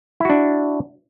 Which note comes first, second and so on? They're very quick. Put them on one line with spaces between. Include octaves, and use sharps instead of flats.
E4 F#4 D4